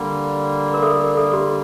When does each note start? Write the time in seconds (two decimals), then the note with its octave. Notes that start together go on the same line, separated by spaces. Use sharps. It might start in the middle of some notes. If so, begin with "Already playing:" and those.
Already playing: D3 G3 A#3
0.74 A#4
0.83 A4
0.99 A#4
1.17 A4
1.33 G4